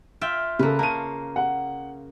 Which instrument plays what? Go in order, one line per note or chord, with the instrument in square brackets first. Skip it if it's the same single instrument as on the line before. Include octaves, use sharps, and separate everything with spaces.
[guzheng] F4 E5 G5
[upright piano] C#3 A4 [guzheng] A#3 B4
[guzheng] C#3 A#3 [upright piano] A5 D#7
[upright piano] F#5